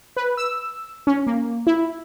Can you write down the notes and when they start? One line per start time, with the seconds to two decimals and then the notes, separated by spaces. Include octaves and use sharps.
0.16 B4
0.37 E6
1.07 C#4
1.27 A#3
1.67 E4